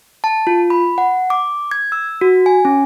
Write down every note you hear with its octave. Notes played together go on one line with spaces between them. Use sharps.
A5
F4
B5
F#5
D6
G#6
E6
F#4
G#5
C#4